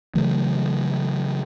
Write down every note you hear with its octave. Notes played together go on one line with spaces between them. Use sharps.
C#3 E3 F#3 A3